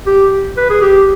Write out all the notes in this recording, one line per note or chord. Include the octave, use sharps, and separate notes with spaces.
G4
B4
G#4
G4